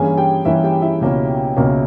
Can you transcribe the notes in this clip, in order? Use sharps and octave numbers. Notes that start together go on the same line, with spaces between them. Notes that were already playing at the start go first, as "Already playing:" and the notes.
Already playing: G2 E3 A#3 C#4 G#4 G#5
G4 G5
G2 E3 A#3 C#4 E4 E5
G4 G5
E4 E5
C#2 B2 A#3 C#4
C#2 B2 A#3 C#4